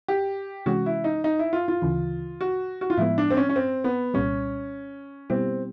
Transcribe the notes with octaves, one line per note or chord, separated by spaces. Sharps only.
G4
C3 E3 G#3 C#4 F#4
E4
D#4
D#4
E4
F4
F4
D2 C#3 E3
F#4
F#4
F4
A2 F3 G#3 B3 E4
D4
C4
C#4
C#4
C4
B3
C2 A#2 G3 C#4
B2 G3 B3 C4 E4 G4